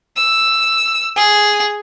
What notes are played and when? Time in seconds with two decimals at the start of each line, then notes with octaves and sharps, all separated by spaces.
0.17 E6
1.16 G#4